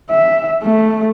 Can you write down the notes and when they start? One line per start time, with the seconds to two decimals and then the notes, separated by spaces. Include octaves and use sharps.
0.11 E5
0.63 A3